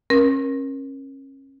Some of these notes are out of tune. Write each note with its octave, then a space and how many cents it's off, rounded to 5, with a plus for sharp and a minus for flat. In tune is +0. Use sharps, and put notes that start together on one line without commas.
C#4 -30 A#4 +25